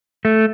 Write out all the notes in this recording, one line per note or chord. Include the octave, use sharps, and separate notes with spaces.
A3